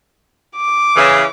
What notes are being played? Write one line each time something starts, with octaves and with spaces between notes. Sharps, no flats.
D6
C#3 E3